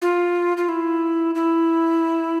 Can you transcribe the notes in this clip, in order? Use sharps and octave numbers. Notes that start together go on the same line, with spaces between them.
F4
F4
E4
E4